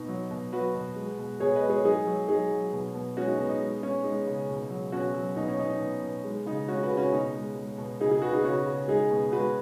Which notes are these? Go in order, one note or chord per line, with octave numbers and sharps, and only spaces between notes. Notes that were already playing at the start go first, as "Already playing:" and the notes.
Already playing: B2 D#4
F#3
B2
F#3 F#4 B4
B2
G#3
B2
B2 G#4 C#5
B4 D#5
G#3
G#4 C#5
F#3 D#4 G#4
F#3
F#3 D#4 G#4
F#3
B2
B2
G#3 C#4 F#4
D#4
B2
D#4
G#3
G#3 C#4
G#3 D#4
C#3
B2
F#3
B2 C#4 F#4
F#3
B2 D#4
C#4
B2 D#4
D#4
B2
B2
G#3
C#3 D#4
G#3 C#4 F#4
F#4 B4
C#3
C#4 F#4
B2 D#4
G#3
G#3
B2
C#3 D#4 G#4
D#4 G#4
C#3 F#4 B4
D#4 G#4
C#3 C#4 F#4
C#3
G#3 D#4 G#4
B2
G#3 F#4 B4